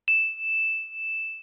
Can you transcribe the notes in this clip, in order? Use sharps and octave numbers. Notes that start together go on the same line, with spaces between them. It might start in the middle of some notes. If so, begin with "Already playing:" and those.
E7